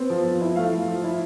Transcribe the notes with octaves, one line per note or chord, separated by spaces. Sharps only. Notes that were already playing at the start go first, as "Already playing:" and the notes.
Already playing: B3 C4
F3
F3
E4
A3 F5
F3
F3
E4